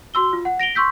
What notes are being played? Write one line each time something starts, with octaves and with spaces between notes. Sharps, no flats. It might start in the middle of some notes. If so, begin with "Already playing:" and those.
F#4 C6 E6 G7
F4
F#5
A#6 D7 F7 G7
C6 C#6 E6 G6 B6